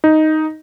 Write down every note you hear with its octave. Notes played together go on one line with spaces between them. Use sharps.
D#4